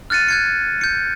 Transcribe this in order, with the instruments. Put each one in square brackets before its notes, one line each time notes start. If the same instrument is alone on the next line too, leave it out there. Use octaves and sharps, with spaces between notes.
[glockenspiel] F6 F#6 A6 C#7 D#7
F#6 G#6 C#7
G6 C#7